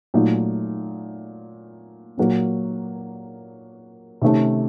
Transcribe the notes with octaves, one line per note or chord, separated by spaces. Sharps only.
A#2 F#3 A3 D#4
A#2 F#3 A#3
C3 D#3 A3 C#4